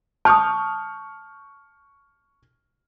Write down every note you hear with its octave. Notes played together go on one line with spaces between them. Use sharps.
A5 C#6 D#6 F6 G6